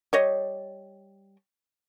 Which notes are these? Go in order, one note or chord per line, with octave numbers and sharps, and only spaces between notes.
G3 C#5 D#5